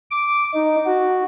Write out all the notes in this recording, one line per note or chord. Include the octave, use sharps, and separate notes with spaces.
D6
D#4
F#4